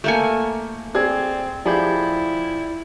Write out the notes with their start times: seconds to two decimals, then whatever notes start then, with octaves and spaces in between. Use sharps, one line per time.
0.04 A3 A#3 G#5 G6 C#7
0.95 C4 G#4 D5 G#6
1.66 F3 E4 G4 G#4 D5 B5 G6